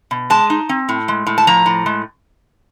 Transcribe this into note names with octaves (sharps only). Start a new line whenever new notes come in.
B2
G#3 A5
D#4
C4
A2
G#3
A2
A5
F3 A#5
A2
G#3